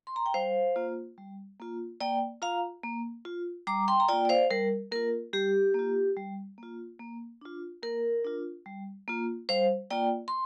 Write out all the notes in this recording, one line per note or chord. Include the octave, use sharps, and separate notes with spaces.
C6
A#5
G5
G3 C5 F5
A#3 F4
G3
A#3 F4
A#3 D5 G5
F4 F5 A#5
A#3
F4
G3 A#5 D6
G5 C6
A#5
A#3 F4 D5 G5
D5
C5 F5
G3 A#4
A#3 F4 A#4
G3 G4
A#3 F4
G3
A#3 F4
A#3
D4 F4
A#3 A#4
D4 F4
G3
A#3 F4
G3 C5 F5
A#3 F4 D5 G5
C6